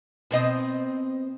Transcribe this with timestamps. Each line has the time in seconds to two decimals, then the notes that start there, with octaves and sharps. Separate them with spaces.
0.31 B2 C4 D#5